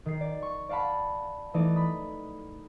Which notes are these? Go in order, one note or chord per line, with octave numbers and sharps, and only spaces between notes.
D#3 C7
D5
C#6
D5 F5 F#5 A5 B5
E3 A3 D#4 D5
B5 D#6